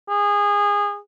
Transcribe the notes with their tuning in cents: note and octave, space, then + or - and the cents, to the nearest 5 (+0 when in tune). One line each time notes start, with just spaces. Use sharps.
G#4 -25